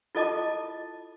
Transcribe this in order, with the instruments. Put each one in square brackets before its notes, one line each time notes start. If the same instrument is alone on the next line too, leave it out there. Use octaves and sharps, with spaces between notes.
[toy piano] E4 F4 A4 D#5 A5 D6